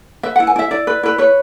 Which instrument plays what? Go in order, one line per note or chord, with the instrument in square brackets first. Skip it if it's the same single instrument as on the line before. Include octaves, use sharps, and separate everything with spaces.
[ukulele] B4 E5
E4 F#5
G#5
E4 E5
E4 D5
B4
E4 B4
B4 C#5